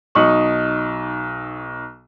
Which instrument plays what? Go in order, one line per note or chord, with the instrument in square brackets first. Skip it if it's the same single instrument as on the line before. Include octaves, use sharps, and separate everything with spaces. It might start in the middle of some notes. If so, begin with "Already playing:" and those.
[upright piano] B1 D#4 D#5 C#6 F#7